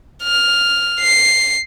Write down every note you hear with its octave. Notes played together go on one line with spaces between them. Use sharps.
F6
C7